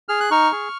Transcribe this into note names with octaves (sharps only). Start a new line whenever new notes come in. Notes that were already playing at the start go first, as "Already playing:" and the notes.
G#4 F6
F#6
D#4 C#6 F6
G#4